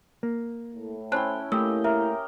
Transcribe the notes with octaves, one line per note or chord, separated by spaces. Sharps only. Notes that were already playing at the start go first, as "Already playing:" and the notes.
A#3
A2
C#4 E4 C5 G5 A5 F#6
A3 A#3 E4 G4 D#5 E6
A#4 E5